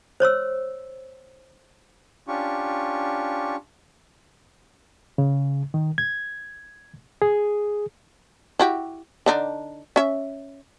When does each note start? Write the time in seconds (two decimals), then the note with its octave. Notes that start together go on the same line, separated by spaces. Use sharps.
0.20 C5 C#5 C6 E6
2.28 C#4 D4 F4 G4 C#6
5.18 C#3
5.74 D#3
5.98 G#6
7.22 G#4
8.59 E4 F#4 G4
9.26 D3 D4 D#4
9.96 C#4 E5